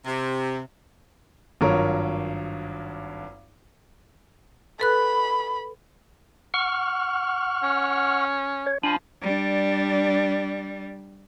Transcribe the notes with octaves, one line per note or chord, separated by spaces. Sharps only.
C3
G#1 G2 F#3 F4 A#4 C#5
A4 B4 B5 F#6
F#5 C#6 F6
C#4
C#5
F3 D4 G#5 B5
G3 D4